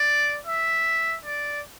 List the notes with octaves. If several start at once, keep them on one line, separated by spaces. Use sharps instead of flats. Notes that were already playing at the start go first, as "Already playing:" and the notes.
Already playing: D5
E5
D5